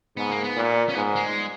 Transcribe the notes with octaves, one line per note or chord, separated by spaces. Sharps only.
G#2 B3
A#3
B3
A#2
C#4
G#2 B3
G#3